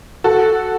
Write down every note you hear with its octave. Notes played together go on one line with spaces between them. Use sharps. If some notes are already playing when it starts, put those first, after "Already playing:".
F#4 A4